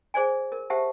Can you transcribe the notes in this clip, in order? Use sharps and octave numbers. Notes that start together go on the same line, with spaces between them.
G#4 C5 D5 G#5
A#4
G4 C5 E5 F#5 A5